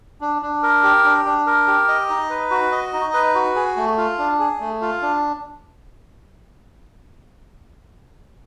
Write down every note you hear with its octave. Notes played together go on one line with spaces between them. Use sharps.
D4
D4
A#4
G4
D4
D4
A#4
G4
D#5
D#4
B4
F#4
D#5
D#4
B4
F#4
G#4
A3
F4
D4
G#4
A3
F4
D4